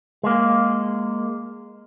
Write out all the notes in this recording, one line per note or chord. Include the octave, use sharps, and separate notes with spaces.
G#3 A#3